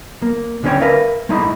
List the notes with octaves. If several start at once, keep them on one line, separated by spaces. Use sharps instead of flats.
A#3
D2 D3 C#4 G#4 C#5 G5
A#4 B4 E5 F5
G#3 A3 D#4 E4 D#5